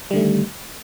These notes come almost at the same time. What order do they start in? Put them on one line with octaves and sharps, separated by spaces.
G3 D3 A3 D#3